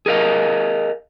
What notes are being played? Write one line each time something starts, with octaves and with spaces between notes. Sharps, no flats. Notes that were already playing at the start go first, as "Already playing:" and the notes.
G#4 A#4 D#5 F5